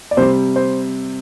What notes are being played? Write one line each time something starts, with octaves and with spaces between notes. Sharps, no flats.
D5
C3 G3 C5
C5